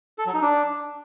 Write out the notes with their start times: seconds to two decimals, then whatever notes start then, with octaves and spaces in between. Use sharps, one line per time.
0.18 A4
0.26 F#3
0.34 D#4
0.42 D4